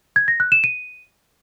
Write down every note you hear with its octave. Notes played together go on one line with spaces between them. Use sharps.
G#6
A#6
F#6
E7
D#7